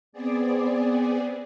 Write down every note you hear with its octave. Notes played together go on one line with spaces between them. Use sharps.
B3 C4 G#4 D5